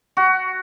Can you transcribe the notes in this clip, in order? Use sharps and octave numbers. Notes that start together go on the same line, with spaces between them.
F#4